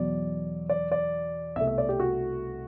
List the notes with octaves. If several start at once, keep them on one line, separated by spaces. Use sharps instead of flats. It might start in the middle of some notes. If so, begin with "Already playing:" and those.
Already playing: E2 B2 F#3 D5
D5
D5
C2 B2 A3 E5
E5
D5
G4
F#4